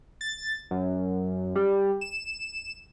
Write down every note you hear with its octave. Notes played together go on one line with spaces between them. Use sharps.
A6
F#2
G3
E7